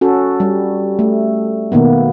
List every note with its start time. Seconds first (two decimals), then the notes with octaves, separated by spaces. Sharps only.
0.01 C#4 F#4 A4
0.40 G3
0.99 A3
1.72 B2 D#3 A#3 B3